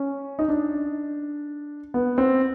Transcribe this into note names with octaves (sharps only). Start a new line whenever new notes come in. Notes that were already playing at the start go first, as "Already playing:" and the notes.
Already playing: C#4
D#4
D4
B3
C4